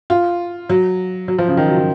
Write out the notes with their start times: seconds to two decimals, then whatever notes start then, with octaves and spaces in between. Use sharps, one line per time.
0.10 F4
0.70 F#3
1.28 F#3
1.38 F3
1.48 C#3
1.57 D#3
1.68 F#3
1.77 D#3